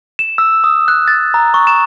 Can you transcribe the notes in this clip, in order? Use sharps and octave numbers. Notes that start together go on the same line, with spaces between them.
E7
E6
D#6
F#6
A6
A#5
C#6
E7